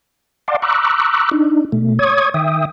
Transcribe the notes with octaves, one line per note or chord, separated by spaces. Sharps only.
D5 F5 F#5 A5 C6 D6
A#5 B5 C#6 D6 E6 F#6
D4 D#4
B2 A3
C#5 C#6 D#6 G#6
D#3 E5 G5 D#6